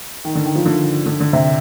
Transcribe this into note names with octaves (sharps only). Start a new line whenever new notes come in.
D#3
D3
D#3
F3
D3
D3
D3
C3